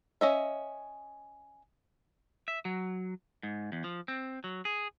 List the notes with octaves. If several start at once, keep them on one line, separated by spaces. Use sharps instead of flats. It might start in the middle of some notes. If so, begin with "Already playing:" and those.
C#4 D#5 E5
E5
F#3
G#2
E2
F3
C4
F#3
G#4